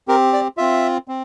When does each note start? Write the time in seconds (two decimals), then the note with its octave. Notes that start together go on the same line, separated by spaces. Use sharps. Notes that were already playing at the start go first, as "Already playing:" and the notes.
0.08 C4 G4 A#4
0.33 D5
0.57 C4 F4 E5
1.08 C4